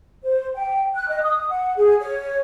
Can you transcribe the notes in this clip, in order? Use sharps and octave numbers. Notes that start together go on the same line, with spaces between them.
C5
G5
F#6
D#5
D#6
F#5
G#4
C#5